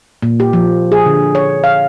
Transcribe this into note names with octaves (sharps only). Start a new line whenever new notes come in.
A#2
G4
F3
G#4
D3
C#5
F5